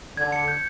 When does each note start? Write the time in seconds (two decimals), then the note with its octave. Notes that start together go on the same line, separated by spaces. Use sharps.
0.17 D3 G#6
0.32 C#7
0.48 G6